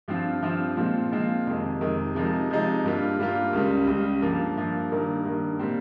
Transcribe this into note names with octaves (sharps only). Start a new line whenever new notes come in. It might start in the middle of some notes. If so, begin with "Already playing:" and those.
G2 F3 C4 F4
G2 F3 C4 F4
A#2 F3 G#3 C4 F4
A#2 F3 G#3 C4 F4
F2 C3 D#3 G#3
F2 C3 D#3 G#3
C3 F3 G#3 D#4
C3 F3 G#3 D#4
G2 G3 A#3 F4
G2 G3 A#3 F4
C#2 C#3 G3
C#2 C#3 G3
G2 F3 A#3
G2 F3 A#3
G2 D#3 A#3
G2 D#3 A#3
A#2 G3 C4